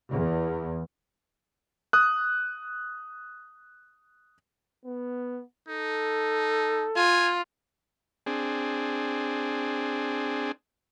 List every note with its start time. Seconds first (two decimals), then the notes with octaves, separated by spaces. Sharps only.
0.12 E2
1.93 D#6 F#6
4.85 B3
5.69 D#4 A4
6.96 F4 G#5
8.26 C4 D4 G#4